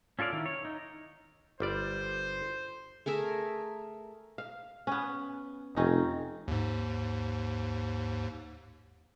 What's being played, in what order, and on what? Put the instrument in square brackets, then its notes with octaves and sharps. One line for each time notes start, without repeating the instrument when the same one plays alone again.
[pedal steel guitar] C#4 F4 A4 D5 F5
D#3 E4
C#5
D#4
[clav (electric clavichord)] G1 G3 D5 [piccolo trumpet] C5
[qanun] A3 G#4 A#4 E5
[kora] F5
B3 C#4
[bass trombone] F1 [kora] C4 C#4 D#4
[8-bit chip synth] D#2 G#2